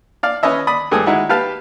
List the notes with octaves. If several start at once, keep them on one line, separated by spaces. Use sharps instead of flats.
D5 F5
C#4 B4 C#5 D#5 E5
D5 B5 D#6
G2 A3 G#4 D#6
G#3 D#4 E4 F#4
G4 B4 F5 A5